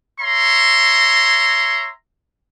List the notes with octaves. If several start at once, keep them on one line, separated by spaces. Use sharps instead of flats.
C#5 E5 A#5 C6